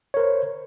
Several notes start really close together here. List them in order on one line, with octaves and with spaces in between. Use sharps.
C#5 A#4 C5